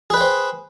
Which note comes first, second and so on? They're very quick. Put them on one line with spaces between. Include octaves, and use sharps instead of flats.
G#4 B4 G5 C5